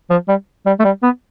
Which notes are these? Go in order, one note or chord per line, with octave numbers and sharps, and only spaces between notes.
F3
G3
G3
A3
G3
B3